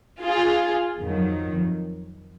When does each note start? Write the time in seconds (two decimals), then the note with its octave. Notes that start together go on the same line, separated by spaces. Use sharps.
0.22 F4 G#4
0.98 F2 D#3 F#3